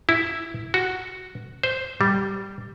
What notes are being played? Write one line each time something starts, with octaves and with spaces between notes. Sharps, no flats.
E4
F#4
C5
G3